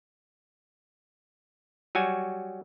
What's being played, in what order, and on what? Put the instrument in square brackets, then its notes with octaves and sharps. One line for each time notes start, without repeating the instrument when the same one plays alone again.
[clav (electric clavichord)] F#3 G3 F#4 G#5